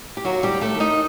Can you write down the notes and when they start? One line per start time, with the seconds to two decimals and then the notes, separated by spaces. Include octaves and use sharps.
0.17 G4
0.24 D#2 F#3 F#4
0.43 G3 G4
0.49 D#2
0.61 A3 A4
0.74 D#3
0.80 D#4 D#5